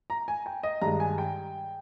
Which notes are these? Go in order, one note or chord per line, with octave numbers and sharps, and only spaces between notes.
A#5
G#5
G5
D#5
G2 D#3 G#3 A#5
G#5
G5